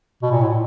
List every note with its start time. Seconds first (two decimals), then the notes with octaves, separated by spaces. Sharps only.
0.23 B2
0.31 A#2
0.41 A2